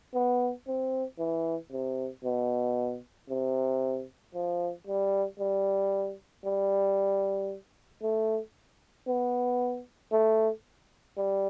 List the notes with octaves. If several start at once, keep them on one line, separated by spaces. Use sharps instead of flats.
B3
C4
E3
C3
B2
C3
F3
G3
G3
G3
A3
B3
A3
G3